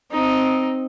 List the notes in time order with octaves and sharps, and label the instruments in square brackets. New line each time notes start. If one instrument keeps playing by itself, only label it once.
[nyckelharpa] C4 D#4